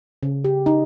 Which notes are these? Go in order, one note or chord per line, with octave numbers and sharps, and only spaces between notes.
C#3
G4
D#4